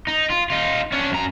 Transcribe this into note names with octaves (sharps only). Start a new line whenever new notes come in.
D#4
F4
D#4 F4
C#4 D4
F#2 A#5